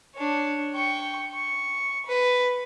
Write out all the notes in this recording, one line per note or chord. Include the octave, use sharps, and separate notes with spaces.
D4 C#5
G5 C#6
C#6
B4